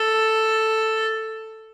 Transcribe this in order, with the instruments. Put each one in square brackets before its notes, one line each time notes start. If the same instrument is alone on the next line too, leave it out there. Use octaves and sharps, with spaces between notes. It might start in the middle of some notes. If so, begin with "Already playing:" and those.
Already playing: [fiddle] A4